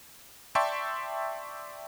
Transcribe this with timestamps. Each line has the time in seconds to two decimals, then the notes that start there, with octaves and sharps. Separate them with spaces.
0.55 D5 E5 G5 A5 C6 C#6